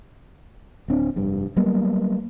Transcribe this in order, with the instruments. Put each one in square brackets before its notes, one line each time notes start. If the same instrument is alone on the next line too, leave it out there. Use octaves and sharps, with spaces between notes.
[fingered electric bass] D1 C4 D4
F1 G2 G3
F#3 G3 A#3 B3